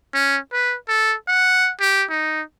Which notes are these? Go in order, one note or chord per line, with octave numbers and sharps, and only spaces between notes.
C#4
B4
A4
F#5
G4
D#4